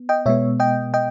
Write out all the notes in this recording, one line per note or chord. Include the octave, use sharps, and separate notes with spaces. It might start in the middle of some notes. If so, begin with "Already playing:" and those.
Already playing: B3
D#5 G5
B2 G#3 B3 C#5 E5
D#5 G5
D#5 G5